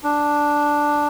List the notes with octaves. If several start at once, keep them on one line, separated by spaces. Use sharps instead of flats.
D4